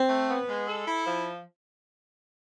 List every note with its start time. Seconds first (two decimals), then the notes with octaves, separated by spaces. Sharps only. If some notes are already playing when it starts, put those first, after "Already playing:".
Already playing: C4
0.09 A3
0.29 B3
0.48 G#3
0.67 A4
0.86 E4
1.05 F3